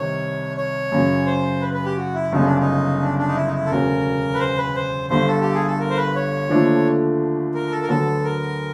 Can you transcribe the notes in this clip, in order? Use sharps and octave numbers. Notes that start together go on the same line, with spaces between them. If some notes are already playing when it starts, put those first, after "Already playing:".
Already playing: C2 C3 D#3 C#5
C#5
F#2 C#3 F#3
C5
B4
B4
G4
F#4
E4
G1 F#2 C#3 D#4
D4
D#4
D4
D4
D#4
E4
D#4
E4
A4
E1 D2 C#3 F#3 A#4
B4
C5
B4
C5
G1 G2 D3 C5
A4
G4
G#4
A4
A#4
C5
B4
C#5
D#2 D3 F3 A3 D4
A#4
A4
A#4
D2 D3 F#3 B3 A4
A#4